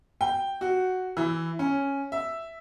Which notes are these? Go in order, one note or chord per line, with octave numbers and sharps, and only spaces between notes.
G5
F#4
E3
C#4
E5